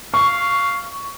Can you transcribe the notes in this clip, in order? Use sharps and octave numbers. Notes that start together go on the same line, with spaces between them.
F5 C#6